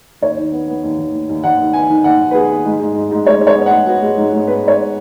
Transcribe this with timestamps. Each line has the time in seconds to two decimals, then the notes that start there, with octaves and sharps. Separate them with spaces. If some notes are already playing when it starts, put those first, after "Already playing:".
0.22 D#2 C#5
0.38 D#3
0.52 B3
0.68 B3
0.83 D#2
0.98 D#2
1.14 D#2
1.29 D#2
1.43 D#2 F#5
1.59 D#3
1.73 B3 G#5
1.90 D#3
2.04 D#2 F#5
2.20 D#2
2.31 B4
2.35 B3 G#4
2.50 B3
2.65 G#2
2.80 G#2
2.95 G#2
3.11 G#2
3.26 G#3 C#5
3.42 G#2
3.47 C#5
3.56 B3
3.66 G#2 F#5
3.86 B3 F#4
4.02 G#3
4.17 G#2
4.33 G#2
4.47 B3 B4
4.63 G#2 C#5